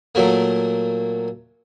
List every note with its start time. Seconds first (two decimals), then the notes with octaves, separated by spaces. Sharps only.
0.15 A#2 F#3 A3 A#3